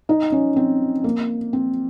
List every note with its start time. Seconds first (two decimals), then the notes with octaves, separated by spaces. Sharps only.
0.09 D#4
0.32 C#4
0.56 C4
1.04 A#3
1.53 C4